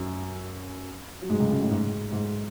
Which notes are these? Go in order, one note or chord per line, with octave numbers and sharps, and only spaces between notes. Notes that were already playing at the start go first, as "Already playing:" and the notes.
Already playing: F#2 F#3
F#3
G#2 G#3
C#2 C#3
C#2 C#3
A1 A2
G#2
G#2